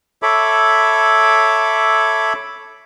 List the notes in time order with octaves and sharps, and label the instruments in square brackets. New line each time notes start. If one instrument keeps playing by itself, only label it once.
[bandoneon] A4 C#5 E5 B5 D6